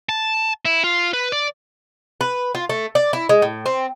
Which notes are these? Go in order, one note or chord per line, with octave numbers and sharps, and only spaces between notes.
A5
E4
F4
B4
D5
B4
F4
A3
D5
E4
G#3
A2
C4